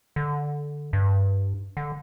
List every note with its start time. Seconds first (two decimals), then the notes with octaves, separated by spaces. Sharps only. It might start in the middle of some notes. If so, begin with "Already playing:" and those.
0.16 D3
0.93 G2
1.77 D3